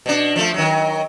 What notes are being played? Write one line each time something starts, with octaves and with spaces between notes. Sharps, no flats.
B2 D4
F3 A3
D#3 F#3